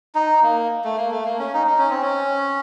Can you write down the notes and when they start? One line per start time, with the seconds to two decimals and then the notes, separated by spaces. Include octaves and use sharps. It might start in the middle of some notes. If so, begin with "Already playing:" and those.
0.15 D#4
0.43 A#3
0.84 A3
0.98 A#3
1.11 A3
1.25 A#3
1.39 C#4
1.54 D#4
1.67 D#4
1.78 C#4
1.90 C4
2.02 C#4